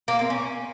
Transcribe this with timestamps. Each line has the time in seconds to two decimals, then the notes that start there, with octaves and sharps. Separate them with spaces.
0.08 A#3
0.19 C4
0.30 C#4